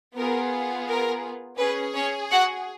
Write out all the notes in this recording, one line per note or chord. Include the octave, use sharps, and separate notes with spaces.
B3 F4 G#4 A#4
A#4
C#4 G#4 B4
C#4 C#5
F#4 F#5